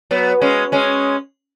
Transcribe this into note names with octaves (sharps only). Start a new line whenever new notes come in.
F#3 B3
G#3 C#4
G#3 C#4